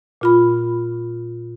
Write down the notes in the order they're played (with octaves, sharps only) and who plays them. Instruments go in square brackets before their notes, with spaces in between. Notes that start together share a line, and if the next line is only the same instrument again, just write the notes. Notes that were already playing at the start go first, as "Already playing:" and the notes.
[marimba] A#2 F4 B5